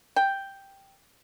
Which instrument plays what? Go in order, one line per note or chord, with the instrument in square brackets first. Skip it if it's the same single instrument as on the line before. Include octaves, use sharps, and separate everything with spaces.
[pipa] G5